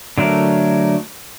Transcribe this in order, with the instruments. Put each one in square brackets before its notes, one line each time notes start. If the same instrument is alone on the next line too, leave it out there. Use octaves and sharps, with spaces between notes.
[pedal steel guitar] D3 F#3 A3 A#4